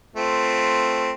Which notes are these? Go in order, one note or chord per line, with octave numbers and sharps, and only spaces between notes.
A3 C4 F4